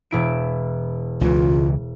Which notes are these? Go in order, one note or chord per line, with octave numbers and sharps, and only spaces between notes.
E1 E4 D7
C#2 C#3 E3 F4